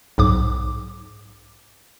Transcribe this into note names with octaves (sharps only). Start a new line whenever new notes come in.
B1 G#2 D6